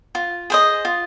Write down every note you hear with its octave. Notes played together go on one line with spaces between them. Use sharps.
F4
G#4 C5 D#5
F4